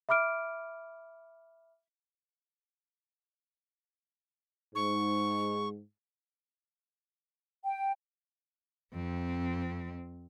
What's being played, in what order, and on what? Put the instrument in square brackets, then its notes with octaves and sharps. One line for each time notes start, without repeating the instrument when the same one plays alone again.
[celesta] E5 B5 D6 F6 D7
[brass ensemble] G#2 [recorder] C#6
[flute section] G5
[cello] F2 C4